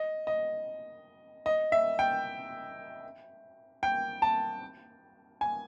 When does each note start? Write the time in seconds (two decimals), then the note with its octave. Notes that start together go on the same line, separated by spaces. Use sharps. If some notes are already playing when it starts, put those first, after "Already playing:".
Already playing: D#5
0.27 D#5
1.46 D#5
1.72 E5
1.99 G5
3.83 G5
4.22 A5
5.41 G#5